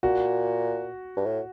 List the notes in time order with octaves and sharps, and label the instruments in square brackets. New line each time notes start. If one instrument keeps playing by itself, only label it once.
[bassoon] A#2 [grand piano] F#4
[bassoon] G2
A2